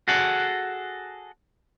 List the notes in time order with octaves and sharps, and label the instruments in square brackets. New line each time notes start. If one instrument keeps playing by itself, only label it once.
[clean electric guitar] F#4 G#4 A4 F#5